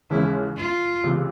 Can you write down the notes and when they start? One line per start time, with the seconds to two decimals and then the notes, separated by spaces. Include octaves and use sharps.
0.10 D#2 C#3 E3 G#3 C#4 E4
0.57 F4
1.04 C#2 C3 E3